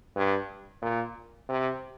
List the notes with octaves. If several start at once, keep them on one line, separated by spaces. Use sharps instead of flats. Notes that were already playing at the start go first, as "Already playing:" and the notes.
G2
A#2
C3